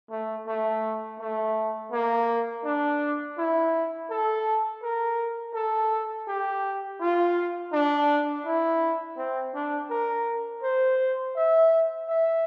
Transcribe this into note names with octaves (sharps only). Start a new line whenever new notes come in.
A3
A3
A3
A#3
D4
E4
A4
A#4
A4
G4
F4
D4
E4
C4
D4
A#4
C5
E5
E5